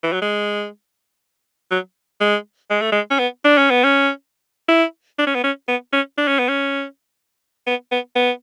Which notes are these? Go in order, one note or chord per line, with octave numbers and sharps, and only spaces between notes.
E3
F#3
G#3
F#3
G#3
G#3
A3
G#3
C#4
B3
D4
C#4
B3
C#4
E4
D4
C#4
B3
C#4
B3
C#4
D4
C#4
B3
C#4
B3
B3
B3